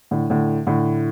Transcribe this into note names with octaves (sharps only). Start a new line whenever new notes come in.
A2 D3
A2 D3
A2 D3